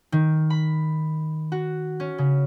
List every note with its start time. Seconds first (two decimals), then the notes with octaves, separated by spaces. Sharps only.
0.12 D#3
0.50 B5
1.52 F#4
2.00 C#4
2.18 C#3